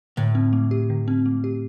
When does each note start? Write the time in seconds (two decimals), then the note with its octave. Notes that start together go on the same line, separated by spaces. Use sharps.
0.17 A2 D3
0.35 C4
0.53 A3
0.71 G4
0.90 D3
1.08 C4
1.26 A3
1.44 G4